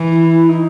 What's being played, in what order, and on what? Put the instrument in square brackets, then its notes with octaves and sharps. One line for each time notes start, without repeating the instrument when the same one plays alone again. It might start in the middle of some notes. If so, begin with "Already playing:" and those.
Already playing: [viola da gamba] E3
[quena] E4
E4
D#4